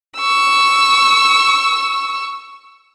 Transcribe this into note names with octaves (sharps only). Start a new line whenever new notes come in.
C#6 E6